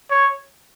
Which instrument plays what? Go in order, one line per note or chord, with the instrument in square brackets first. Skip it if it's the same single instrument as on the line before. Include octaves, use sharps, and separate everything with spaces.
[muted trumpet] C#5